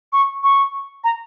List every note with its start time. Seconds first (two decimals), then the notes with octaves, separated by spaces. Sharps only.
0.13 C#6
0.44 C#6
1.04 A#5